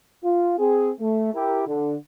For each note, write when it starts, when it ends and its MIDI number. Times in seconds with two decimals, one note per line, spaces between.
0.24 0.57 65
0.58 0.91 60
0.58 0.91 68
1.00 1.32 57
1.34 1.64 64
1.34 1.64 67
1.34 1.64 70
1.67 1.96 50